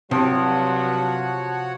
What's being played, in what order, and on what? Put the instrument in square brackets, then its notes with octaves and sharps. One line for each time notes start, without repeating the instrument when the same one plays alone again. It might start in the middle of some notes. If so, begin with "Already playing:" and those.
[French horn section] G2 F#3 [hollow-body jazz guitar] C3 [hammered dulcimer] F3 [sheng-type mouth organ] F#4 C#5 F#5